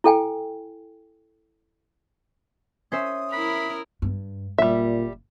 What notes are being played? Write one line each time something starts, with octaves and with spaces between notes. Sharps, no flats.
E4 A4 G5 G#5
C#4 C5 E5 D#6
E4 A#4 B5
G2
F#1 A#2 G3 E5